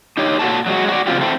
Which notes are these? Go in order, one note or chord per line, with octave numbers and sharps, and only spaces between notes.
D#4 G4 C#5
A#2 C#3 F#4 A4 C#5 A5
F#3 G#3 F#4
F#4 D5
C#3 F#3 C4 F4 G4
C4 E4 A4